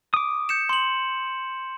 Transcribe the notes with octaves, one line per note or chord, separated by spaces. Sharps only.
D6 D#6
G6 C#7 E7
C6 F#7